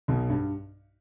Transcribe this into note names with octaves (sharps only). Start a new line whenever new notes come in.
B1 B2
G2